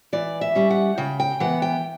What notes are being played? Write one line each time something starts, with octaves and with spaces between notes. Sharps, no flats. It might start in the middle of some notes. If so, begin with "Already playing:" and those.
E3 D5
E5
G3 C#4
F#5
C#3 G5
G5
E3 B3 F#5
G5